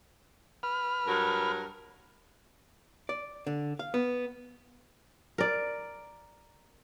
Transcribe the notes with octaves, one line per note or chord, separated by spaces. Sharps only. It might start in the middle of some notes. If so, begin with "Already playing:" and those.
B4 F6
G2 F#3 A#4
D5
D3
F5
B3
A#4 D5